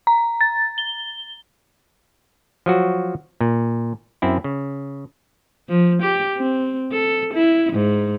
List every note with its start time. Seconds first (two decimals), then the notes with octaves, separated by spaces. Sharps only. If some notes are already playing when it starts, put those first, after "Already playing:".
0.07 A#5
0.41 A6
0.78 G7
2.66 F3 F#3 F#4
3.41 A#2
4.22 F#2 C4 E4
4.44 C#3
5.69 F3
6.02 G4
6.37 C4
6.91 A4
7.34 E4
7.73 G#2